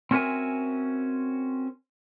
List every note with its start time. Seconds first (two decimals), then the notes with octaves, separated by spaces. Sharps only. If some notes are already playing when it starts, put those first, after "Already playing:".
0.11 C4 C#4 F#4 A#4 E5 G#5